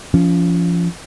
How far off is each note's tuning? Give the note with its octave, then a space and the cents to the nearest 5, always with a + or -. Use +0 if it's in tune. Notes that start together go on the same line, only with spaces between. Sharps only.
F3 -20 C#4 +30